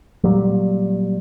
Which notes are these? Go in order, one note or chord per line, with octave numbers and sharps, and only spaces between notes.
A#2 F#3 G3